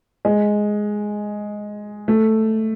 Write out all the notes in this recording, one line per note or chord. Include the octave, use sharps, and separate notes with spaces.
G#3
A3